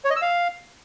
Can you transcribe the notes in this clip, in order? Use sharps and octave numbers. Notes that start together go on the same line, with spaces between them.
C#5
D#5
E6
F5